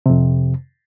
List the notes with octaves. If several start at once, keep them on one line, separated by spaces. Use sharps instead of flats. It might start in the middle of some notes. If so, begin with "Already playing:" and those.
F2 C3